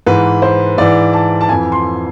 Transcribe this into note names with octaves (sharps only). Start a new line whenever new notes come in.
G#2 E3 B4
C5
G#2 E3 D5
A5
A5
F2 E3 G#5
C6